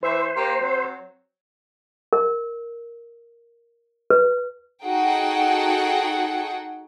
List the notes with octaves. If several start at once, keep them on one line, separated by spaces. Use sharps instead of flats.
E3 C5 E5
A#3 G4
F#3 C4
A#4
B4
D#4 F#4 G#4 A4 F#5 G5